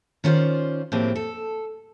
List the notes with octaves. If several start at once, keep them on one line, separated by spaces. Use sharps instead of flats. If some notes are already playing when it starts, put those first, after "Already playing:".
D#3 C#4 F4 C5 D5
A2 F3 G#3 A#3 C4 G4
A4